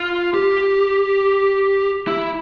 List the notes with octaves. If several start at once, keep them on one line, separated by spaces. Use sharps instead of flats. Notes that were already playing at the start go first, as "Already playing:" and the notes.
Already playing: F4
G4
E4